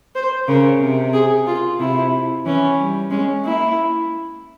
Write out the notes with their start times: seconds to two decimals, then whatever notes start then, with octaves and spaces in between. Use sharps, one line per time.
0.15 C5
0.47 C#3 A#4
0.80 C3
1.13 G#4
1.46 F4
1.79 C3 E4
2.46 E3 C#4
2.79 G3
3.11 G#3 C#4
3.44 A#3 E4